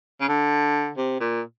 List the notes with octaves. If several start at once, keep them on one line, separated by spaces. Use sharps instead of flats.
C#3
D3
C3
A#2